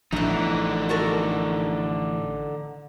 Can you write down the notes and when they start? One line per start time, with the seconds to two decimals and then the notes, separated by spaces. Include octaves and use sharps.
0.12 A1 B2 D3 E3 F3 D4 D#4
0.89 F#4 A4 A#4